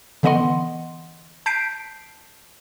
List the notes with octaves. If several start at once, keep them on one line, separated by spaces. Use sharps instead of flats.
D3 E3 B3 D#5 F#5 C6
A5 G6 B6 C7 D7